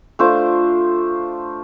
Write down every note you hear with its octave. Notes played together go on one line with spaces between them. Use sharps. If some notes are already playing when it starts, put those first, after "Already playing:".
A3 D4 F4 C5